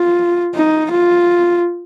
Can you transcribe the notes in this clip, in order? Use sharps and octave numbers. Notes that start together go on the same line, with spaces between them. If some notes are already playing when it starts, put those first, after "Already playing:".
Already playing: F4
D#4
F4